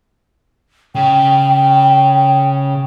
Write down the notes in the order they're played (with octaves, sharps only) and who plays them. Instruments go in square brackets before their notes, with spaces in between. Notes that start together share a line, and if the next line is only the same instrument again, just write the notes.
[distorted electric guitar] C#3 [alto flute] G5